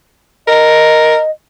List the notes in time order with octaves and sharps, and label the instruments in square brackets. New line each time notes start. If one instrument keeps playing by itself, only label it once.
[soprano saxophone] A#4 [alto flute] D#5